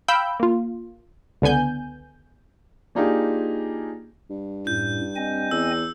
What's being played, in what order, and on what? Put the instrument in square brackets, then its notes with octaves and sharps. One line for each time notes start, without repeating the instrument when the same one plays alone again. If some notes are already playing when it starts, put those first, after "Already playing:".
[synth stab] F5 G5 B5 E6 G6
A#3 F4
C#2 D3 B3 G#5 G6
[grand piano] A#3 D4 D#4 F4 G4 G#4
[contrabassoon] G2
[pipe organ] F#2 A2 [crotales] G6
[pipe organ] C4 D#5 G#5
[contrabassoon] E2 [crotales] E6